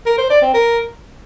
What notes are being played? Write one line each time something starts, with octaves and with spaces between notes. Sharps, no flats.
A#4
C5
D5
C4
A#4